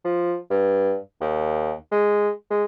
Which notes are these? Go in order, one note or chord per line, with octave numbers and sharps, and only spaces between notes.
F3
G2
D#2
G#3
G#3